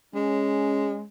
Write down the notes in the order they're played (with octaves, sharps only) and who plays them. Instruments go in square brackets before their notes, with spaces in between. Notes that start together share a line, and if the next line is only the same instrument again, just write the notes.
[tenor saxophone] G#3 [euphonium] C#4